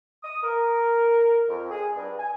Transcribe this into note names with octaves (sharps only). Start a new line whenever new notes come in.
D#6
A#4
F2
G#4
G2
G#5